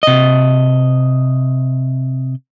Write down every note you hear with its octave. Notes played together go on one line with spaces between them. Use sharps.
C3 D#5